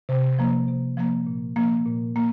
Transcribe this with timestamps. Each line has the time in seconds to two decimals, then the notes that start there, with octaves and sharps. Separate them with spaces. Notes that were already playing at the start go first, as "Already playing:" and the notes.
0.09 C3
0.39 F3 A#3
0.68 C3
0.97 F3 A#3
1.27 A#2
1.56 F3 A#3
1.85 A#2
2.16 A#3